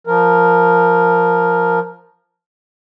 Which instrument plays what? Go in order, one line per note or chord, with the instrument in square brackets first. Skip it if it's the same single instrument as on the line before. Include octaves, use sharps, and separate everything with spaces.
[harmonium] F3 A#4